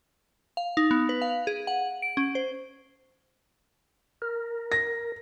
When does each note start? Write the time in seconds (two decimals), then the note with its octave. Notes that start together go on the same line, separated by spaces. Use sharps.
0.57 F5
0.77 D#4
0.91 B3
1.09 B4
1.22 F5
1.47 G#4
1.67 F#5
2.02 D7
2.17 C#4
2.35 C5
4.22 A#4
4.72 A#6